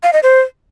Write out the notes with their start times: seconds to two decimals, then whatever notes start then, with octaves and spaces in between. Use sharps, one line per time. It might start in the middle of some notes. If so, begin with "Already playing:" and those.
0.03 F5
0.13 D#5
0.23 C5